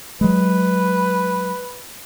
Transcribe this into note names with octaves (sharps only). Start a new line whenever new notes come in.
F#3 G#3 B4